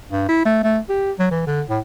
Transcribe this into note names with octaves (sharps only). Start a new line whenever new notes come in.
G2
E4
A3
A3
G4
F#3
E3
D3
A2